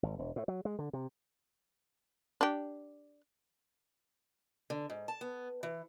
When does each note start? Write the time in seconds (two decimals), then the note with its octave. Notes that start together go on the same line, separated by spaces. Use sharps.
0.03 G#1
0.19 E1
0.36 A2
0.48 F#3
0.65 G#3
0.79 D3
0.93 C3
2.41 D4 G4
4.70 D3
4.90 G#2
5.08 A5
5.21 B3
5.63 E3